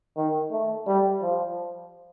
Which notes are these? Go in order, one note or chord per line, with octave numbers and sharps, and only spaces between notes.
D#3
A3
G3
F3